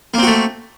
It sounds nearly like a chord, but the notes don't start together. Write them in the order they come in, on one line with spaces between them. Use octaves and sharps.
A#3 C4 F#4 A3